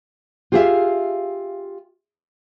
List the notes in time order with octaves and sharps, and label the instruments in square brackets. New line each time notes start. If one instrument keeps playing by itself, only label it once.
[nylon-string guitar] F4 G4 G#4 D5 E5 F5